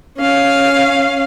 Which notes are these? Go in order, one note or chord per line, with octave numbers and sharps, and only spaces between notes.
C#4 F5